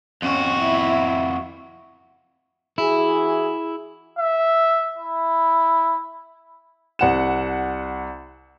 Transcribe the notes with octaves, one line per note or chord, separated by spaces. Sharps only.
F2 C#4 F#4
E4 E5
E3 E4 F#4 G#4
E5
E4
C2 F#5 E7